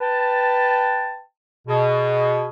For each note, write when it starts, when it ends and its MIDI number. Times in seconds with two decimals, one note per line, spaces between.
0.01 1.22 71
0.01 1.22 79
0.01 1.22 81
1.68 2.49 47
1.68 2.49 68